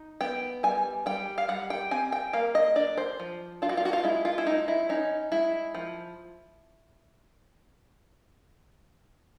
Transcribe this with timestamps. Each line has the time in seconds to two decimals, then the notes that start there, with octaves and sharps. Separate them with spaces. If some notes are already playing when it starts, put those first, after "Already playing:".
Already playing: D#4
0.21 B3 G5
0.63 G3 G#5
1.06 G3 G5
1.38 F5
1.48 G3 F#5
1.70 G5
1.91 C4 G#5
2.12 G5
2.33 A#3 F5
2.55 D#5
2.76 D4 D5
2.97 C5
3.20 F3
3.62 D4 F4
3.69 F#4
3.77 F4
3.85 F#4
3.93 F4
4.04 G#3 E4
4.25 F4
4.38 E4
4.46 G#3 D#4
4.68 E4
4.89 C#4 D#4
5.32 G#3 E4
5.75 F3